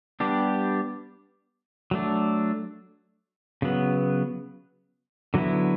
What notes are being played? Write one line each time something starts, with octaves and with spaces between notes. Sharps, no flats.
G3 B3 D4 G4
F#3 A3 D4
C#3 F#3 B3
D3 F#3 B3 E4